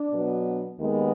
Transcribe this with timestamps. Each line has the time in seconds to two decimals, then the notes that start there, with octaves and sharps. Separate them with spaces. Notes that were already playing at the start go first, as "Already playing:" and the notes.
Already playing: D4
0.11 B2 F#3 B3
0.78 D#2 D#3 G#3 B3